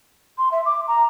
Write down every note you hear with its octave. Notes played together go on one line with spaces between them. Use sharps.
C6
E5
D6
A#5